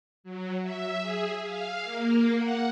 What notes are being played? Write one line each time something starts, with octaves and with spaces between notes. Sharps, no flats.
F#3
E5
G#4
F5
A#3
F#5